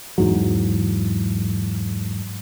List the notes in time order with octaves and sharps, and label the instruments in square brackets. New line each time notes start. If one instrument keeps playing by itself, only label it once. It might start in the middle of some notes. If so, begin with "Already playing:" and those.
[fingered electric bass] E2 G#2 F#3